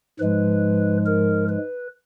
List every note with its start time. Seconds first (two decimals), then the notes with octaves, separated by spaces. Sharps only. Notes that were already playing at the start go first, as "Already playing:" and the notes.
0.19 G#2 F3 G#3 B4
1.06 A#4
1.48 B4